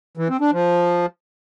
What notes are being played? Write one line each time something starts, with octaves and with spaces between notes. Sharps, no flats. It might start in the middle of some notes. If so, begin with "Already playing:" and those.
E3
C4
D4
F3